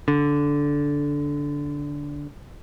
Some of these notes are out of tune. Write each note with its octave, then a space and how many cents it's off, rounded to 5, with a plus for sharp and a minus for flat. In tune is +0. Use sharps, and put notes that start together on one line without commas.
D3 -15